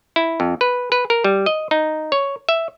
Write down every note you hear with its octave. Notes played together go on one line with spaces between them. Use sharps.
E4
F2
B4
B4
A#4
G3
D#5
D#4
C#5
E5